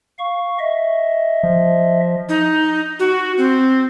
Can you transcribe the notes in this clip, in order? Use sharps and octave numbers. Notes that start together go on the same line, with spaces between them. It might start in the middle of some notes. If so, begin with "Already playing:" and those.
F5 C#6
D#5 E5
F3
D#4
F#4
C4